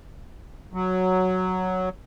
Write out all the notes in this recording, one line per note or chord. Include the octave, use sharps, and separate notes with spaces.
F#3